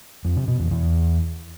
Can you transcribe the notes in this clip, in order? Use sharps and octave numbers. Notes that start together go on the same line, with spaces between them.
F2
C3
B2
E2
E2